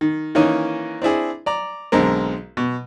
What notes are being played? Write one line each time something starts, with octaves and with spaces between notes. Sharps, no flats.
D#3
D#3 E3 A#3 C#4 D#4
C4 D4 E4 G#4
D5 A#5
B1 D3 G#3 C4 A#4
B2